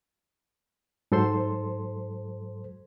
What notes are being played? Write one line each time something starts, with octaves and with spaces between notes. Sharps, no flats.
G#2 F#3 A4 C5 C6